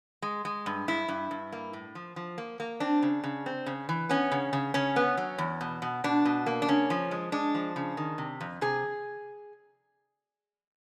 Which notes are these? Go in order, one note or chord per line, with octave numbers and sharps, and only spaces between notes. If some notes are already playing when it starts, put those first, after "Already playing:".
G#3
G#3
G2
G2 E4
G2
G2
A#3
A2
F3
F3
A#3
A#3
C4 D4
C#3
C#3
C4
C#3
E3
B3 C#4
C#3
C#3
C#3 C#4
B3
F#3
E2
B2
B2
B2 D4
B2
A#3
D4
C#3 C#4
F3
G#3
G#3 D4
F3
C#3
D#3
C3
F2
C3 G#4